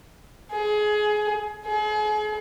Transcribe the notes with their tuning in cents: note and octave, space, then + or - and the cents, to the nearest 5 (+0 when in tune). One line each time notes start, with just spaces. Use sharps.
G#4 +20
G#4 +40